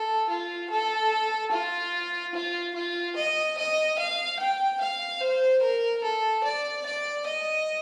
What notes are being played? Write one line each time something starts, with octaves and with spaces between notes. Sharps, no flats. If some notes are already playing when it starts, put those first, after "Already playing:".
Already playing: A4
F4
A4
F4
F4
F4
D#5
D#5
F5
G5
F5
C5
A#4
A4
D5
D5
D#5